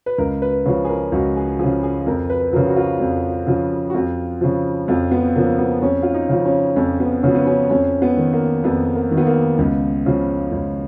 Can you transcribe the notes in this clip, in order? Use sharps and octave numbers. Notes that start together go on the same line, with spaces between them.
B4
C#2 A#4
B4
C#3 F3
G#4
A#4
C#2 F#4
G#4
C#3 F3 G#4
G#4
F2 A#4
B4
C#3 F3 A#4
F#4
F4
F2
C#3 F3
F#4
F2 F4
C#3 F3
F2 F4
B3
C#3 F3 A#3
B3
F2 C#4
F4
D#4
C#3 F3
C#4
F2 C#4
B3
C#3 F3 C#4
B3
C#4
F2 C#4
B3
D#3
A#3
F2 B3
A#3
D#3
B3
A#3
C#2 B3
C#3 F3
C#2